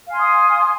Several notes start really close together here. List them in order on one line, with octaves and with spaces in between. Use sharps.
F5 G#5 C6 D#6